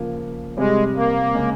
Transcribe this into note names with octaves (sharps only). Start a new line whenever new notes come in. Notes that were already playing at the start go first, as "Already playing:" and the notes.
Already playing: C#3 F3 A#3
C3 G3 G#3 C4 G4 C5
A#3
C#3 G#3 C#4 G#4